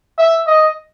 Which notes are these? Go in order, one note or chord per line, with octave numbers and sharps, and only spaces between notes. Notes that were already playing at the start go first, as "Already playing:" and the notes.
E5
D#5